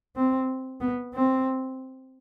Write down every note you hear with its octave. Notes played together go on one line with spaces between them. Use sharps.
C4
B3
C4